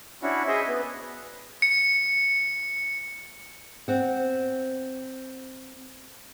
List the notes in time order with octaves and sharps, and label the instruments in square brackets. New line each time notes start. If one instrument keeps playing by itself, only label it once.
[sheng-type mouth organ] C#4 D4 E4 F#4
G#4 C5 D#5 E5
B3
[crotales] C#7
[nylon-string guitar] C4 F#5